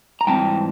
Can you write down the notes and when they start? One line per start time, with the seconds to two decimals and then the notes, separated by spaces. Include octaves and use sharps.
0.21 A#5
0.27 G#2 E3 G3 C4 G5 A5